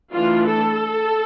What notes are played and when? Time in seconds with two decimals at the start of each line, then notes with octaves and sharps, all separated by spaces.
0.13 E3 A3 D4 F4
0.47 A4